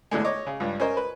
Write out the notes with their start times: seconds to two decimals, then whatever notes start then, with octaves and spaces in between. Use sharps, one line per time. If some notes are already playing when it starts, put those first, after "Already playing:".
0.11 E2 A2 D3 G#3
0.24 C#5 D#5 D6
0.47 C#3
0.60 C#2 G2
0.80 C#4 A#4 C5 D#5
0.97 B4